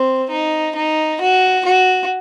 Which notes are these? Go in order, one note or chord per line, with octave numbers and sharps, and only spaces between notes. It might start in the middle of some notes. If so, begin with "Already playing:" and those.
Already playing: C4
D#4
D#4
F#4
F#4